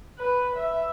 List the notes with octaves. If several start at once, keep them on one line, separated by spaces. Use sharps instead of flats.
B4
E5